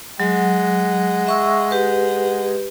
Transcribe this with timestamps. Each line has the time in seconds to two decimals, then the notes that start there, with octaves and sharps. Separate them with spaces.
0.20 F#3 G#3 F#5
1.27 E5 C#6 E6
1.71 G4 B4